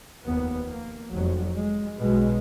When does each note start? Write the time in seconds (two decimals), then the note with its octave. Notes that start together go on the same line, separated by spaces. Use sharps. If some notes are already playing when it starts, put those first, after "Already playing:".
0.24 F1 D#2 B3
0.68 A#3
1.10 F1 F2 F#3
1.55 G#3
1.98 B1 B2 G#3